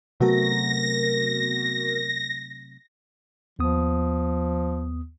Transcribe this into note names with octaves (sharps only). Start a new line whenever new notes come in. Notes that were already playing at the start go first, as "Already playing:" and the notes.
C3 F#3 A3 B3 F#4 A#4 A#6
D#2 F3 B3 D#6